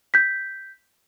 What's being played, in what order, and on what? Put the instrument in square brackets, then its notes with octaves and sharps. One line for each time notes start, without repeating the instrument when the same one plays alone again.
[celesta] G6 B6